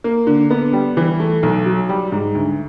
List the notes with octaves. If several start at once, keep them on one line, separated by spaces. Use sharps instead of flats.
A#3
D3
B3
G3
E3
A3
B1
F#3
G3
G#2
D2